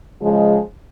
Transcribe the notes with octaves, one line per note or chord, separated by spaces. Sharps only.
C#3 F3 G#3